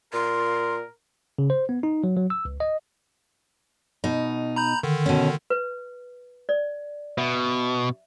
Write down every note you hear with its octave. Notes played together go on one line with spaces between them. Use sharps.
A#2 A#4 C6
C#3
C5
B3
D#4
F#3
F#3
E6
C#2
D#5
B2 D#4
A#5 B5 G6
D3 D#3
B2 C#4
B4
D5
B2 E5